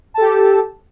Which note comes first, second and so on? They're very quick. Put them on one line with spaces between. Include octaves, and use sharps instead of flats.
A5 A4 G4